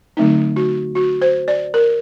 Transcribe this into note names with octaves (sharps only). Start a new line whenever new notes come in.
D3 F#3 A3 C4 D#4
F#4
F#4
C5
D5
A#4